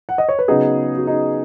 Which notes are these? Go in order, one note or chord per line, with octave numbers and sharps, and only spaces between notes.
F#5
D#5
C#5
B4
C#3 F#3 B3 D#4 G#4
F#4
D#4